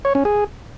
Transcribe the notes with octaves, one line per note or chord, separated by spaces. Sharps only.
C#5
C#4
G#4